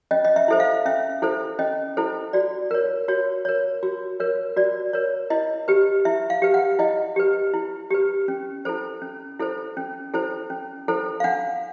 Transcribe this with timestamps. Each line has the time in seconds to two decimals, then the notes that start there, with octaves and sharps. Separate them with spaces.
0.11 C#4 D#5
0.25 D#5
0.36 E5
0.48 E4 A4 C5 E5
0.60 F5
0.86 C#4 E5
1.22 E4 A4 C5
1.59 C#4 D#5
1.97 E4 A4 C5
2.33 F#4 D5
2.71 A#4 C#5
3.08 F#4 C#5
3.45 A#4 C#5
3.83 F#4
4.20 A#4 C#5
4.56 F#4 D5
4.93 A#4 C#5
5.30 E4 D#5
5.68 G4 B4
6.05 E4 E5
6.30 F5
6.42 G4 B4
6.54 F#5
6.79 E4 D#5
7.16 G4 B4
7.54 E4
7.91 G4 B4
8.28 C#4
8.65 E4 A4 C5
9.02 C#4
9.39 E4 A4 C5
9.77 C#4
10.14 E4 A4 C5
10.50 C#4
10.88 E4 A4 C5
11.20 F5
11.24 D4 F#5